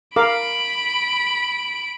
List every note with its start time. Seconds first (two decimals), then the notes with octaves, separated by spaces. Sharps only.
0.16 A#4 F5 B5 D6 D7